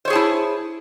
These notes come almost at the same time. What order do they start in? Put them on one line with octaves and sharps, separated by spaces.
C5 C#5 G#4 A5 E4